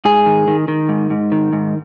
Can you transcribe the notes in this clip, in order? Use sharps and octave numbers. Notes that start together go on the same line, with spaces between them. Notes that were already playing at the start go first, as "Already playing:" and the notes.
G#2 G#4
D#3
D#3
D#3
G#2
G#2
D#3
G#2